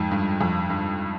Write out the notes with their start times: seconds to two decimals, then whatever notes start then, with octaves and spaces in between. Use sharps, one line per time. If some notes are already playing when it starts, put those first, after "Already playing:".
Already playing: F2 G#2
0.11 G2
0.41 F2
0.70 G2